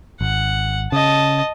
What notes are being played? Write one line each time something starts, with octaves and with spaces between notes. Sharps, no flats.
G#1 F#5
C#3 D#5 A5